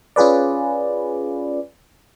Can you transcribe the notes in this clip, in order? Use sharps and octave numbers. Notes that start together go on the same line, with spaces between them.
C#4 F4 G#4 B4 D5